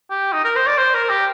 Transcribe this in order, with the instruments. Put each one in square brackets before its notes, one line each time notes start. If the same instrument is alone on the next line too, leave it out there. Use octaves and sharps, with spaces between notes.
[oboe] G4
D#4
A#4
C5
D5
C5
A#4
G4